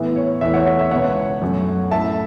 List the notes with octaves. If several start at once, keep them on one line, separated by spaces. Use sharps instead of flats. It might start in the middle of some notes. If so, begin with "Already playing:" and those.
Already playing: A2 E3 B3 E5
C#5
E2 E3 A3 E5
C#5 F#5
C#5 F#5
E5
C#2 B2 B3 C#5 F#5
F#2 F#3 A3
A2 A3 E5 A5